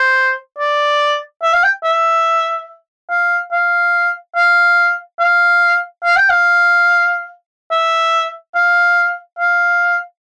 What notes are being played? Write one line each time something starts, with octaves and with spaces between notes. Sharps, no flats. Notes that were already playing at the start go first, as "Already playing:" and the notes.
Already playing: C5
D5
E5
F5
G5
E5
F5
F5
F5
F5
F5
G5
F5
E5
F5
F5